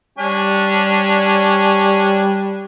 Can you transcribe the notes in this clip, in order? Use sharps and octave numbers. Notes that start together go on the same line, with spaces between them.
G3 C#4 D4 G#5